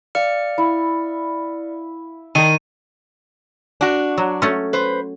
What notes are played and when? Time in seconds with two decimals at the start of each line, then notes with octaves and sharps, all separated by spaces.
0.15 D5 F5 F6 C#7
0.58 E4
2.35 D#3 A#4 D#7
3.81 D4 F#4
4.18 F#3
4.42 A3 C#4
4.73 B4 C5